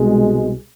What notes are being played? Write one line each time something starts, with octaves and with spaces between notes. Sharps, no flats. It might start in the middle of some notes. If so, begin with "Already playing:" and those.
Already playing: C2 B2 G#3